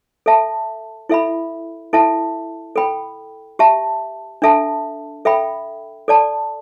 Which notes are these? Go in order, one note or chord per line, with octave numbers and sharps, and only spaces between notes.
A4 E5 A5
E4 A4 E5 B5
E4 A4 E5 A5
A4 G5 B5
G4 E5 A5
D4 A4 E5 A5
A4 E5 G5 B5
A4 D5 A5